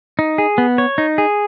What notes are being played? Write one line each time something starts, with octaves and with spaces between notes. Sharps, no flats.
D#4
G#4
B3
C#5
D#4
G#4